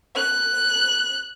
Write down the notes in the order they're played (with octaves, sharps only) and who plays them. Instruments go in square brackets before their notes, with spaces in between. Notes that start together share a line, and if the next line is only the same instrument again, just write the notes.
[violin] F#6